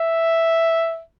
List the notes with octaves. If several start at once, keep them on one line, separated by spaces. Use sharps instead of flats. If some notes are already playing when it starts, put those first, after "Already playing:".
Already playing: E5